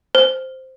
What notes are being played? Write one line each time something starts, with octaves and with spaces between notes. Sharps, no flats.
C5